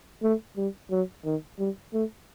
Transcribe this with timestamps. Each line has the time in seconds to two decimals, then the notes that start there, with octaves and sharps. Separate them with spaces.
0.23 A3
0.57 G3
0.91 F#3
1.25 D#3
1.59 G3
1.93 A3